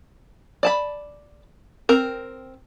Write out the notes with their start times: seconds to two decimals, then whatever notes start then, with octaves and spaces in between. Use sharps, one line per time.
0.63 D5 A5 B5
1.89 C4 A#4